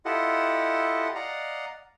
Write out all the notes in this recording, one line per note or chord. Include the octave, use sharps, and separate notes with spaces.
E4 F4 G4 A4 D#5 F#5
D5 D#5 F5 F#5 A#5